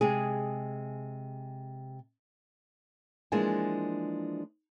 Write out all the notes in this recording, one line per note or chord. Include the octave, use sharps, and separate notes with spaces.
C3 G#3 G#4
E3 F3 G#3 A#3 D4 G#5